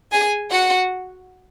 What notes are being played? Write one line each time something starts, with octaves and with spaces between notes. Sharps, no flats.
G#4 G#5
F#4 F#5